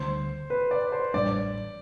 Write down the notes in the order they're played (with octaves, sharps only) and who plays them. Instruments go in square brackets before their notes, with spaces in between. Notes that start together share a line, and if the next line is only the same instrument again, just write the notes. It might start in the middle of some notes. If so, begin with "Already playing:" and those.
Already playing: [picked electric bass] D2 D3 G3 D4 [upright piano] C5
[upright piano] B4
D5
C5
[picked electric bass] A1 A2 G3 D4 [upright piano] D5